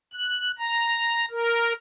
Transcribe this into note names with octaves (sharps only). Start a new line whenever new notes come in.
F#6
A#5
A#4